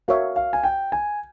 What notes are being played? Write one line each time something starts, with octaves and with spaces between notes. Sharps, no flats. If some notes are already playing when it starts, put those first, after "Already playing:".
F#4 A#4 C#5 E5 F5
F5
G#5
G5
G#5